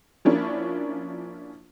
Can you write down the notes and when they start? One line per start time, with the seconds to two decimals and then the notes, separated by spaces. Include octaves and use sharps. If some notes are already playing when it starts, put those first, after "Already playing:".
0.25 F3 A#3 C#4 D4 E4